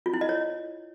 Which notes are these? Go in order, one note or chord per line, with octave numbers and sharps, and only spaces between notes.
F4
E4
D#5
C#5